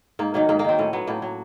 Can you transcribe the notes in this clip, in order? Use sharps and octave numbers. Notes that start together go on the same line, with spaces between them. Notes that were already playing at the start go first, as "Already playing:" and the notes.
G#2 A#3
D#3 F#3 A#3
G#2 A#3
A#3
D#3 F#3 C4
A2 C#4
F#3 B3
A2 A#3
F#3